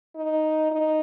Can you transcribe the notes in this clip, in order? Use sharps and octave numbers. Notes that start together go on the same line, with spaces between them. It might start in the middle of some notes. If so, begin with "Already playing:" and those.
D#4
D#4